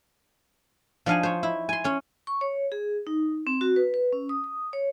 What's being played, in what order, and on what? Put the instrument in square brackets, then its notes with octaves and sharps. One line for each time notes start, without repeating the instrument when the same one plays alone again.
[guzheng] F3 D4 D#4 F5 F#5 G#5
C5 C#5
E4
G#5 C6
C#4 C#5
[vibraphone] C#6
C#5
G#4
D#4
C4
F#4
B4
B4
C#4
D#6
D#6
C#5